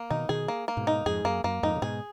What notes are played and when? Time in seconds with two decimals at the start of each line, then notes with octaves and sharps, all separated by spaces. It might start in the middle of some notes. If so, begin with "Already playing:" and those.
Already playing: A#3
0.10 B2 D#3 D#4
0.29 B2 D#3 G#4
0.48 A#3
0.68 A#3
0.77 G#2 B2
0.87 D#4
1.06 F2 G#2 G#4
1.24 F#2 A#3
1.44 F#2 A#3
1.63 F2 G#2 D#4
1.76 C#3
1.82 G#2 B2 G#4